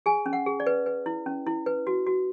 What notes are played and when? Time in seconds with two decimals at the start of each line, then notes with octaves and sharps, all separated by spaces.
0.06 G#4 G#5
0.26 C#4
0.33 F#5
0.46 G#4
0.60 D5
0.67 B4
0.86 B4
1.06 E4
1.26 C#4
1.46 E4
1.66 B4
1.87 F#4
2.07 F#4